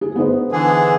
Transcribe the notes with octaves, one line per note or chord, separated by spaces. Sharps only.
G#4
B3 D#4 C5
D3 E3 G#4